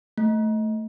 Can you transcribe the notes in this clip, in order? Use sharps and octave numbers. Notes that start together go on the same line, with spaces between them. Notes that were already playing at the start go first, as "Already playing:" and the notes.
A3